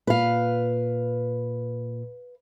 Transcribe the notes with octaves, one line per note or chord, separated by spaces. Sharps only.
A#2 B4 F5